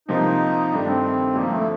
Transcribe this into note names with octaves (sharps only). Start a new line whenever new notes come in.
C3 F3 A#3 D#4 F4
G2 D#3 A3 D4
C4
D2 D3 F3 A#3
A3